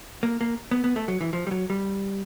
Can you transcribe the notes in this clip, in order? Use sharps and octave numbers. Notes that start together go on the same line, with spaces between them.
A#3
A#3
B3
B3
A3
F#3
E3
F3
G3
F#3
G3